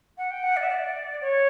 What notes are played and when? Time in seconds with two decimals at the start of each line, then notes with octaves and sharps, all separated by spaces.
0.17 F#5
0.30 G5
0.43 F#5
0.56 D5
0.62 E5
0.68 D5
1.21 C#5